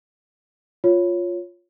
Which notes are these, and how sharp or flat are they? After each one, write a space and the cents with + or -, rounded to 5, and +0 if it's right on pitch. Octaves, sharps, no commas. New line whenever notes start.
F4 +5 C#5 +0